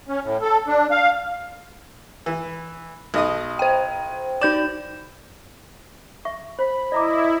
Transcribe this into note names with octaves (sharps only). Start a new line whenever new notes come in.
C#4
A2
A4
D4
F5
E3
B1 D#5 D#6
C5 G5
D#4 D5 G6 E7
E5 C#6
C5 B5
E4 D5 D#5 A#5 D6